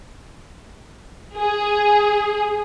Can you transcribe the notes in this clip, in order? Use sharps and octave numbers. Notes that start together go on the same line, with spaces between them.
G#4